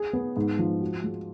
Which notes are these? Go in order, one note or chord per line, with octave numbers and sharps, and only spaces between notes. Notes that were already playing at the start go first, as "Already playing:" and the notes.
Already playing: G#4
B3
G#2
F3
F#4
G#3